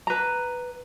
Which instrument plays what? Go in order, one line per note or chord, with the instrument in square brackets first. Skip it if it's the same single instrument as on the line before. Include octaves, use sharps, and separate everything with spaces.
[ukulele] B4 A#5